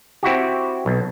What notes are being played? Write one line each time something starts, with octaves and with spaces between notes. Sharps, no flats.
C4 E4 F#4 G4
B1